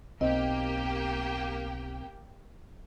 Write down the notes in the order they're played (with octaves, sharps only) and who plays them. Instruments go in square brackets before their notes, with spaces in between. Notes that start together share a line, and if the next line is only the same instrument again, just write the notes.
[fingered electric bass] B1 [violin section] A#3 G4 G5 [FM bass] C4 [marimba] D#5